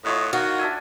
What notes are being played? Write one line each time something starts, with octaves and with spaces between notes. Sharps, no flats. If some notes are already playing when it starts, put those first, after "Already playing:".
A2 F4 C#5 D#5 F#5
D#3 F#4 F5
D4 E5 G#5